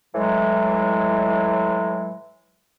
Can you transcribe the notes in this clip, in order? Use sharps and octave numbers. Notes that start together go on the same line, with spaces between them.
A2 E3 F#3 G#3